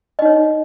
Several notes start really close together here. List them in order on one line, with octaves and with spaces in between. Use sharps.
D#5 D#4 C#5